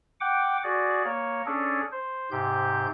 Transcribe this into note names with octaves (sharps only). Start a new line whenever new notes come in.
F#5 G5 D6
F#4 G#4 D5
A#3 C#5
C#4 D4 G#4 A4
C5
G#2 C3 G4 G6